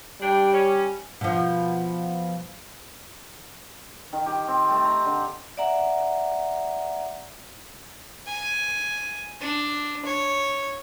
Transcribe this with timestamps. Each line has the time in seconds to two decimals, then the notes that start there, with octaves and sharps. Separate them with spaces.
0.21 G3 D4 G5
0.53 C#4
1.21 B2 F3
4.13 D#3
4.26 G4
4.48 C4
4.70 A3
4.85 A#5
5.05 D3
5.57 D5 E5 F#5 A#5
8.27 G#5
9.41 D4
10.05 C#5